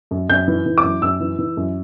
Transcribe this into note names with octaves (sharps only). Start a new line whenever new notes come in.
F#2
F#2 G6
E3
E3
D6
F#2
F#2 E6
E3
E3
F#2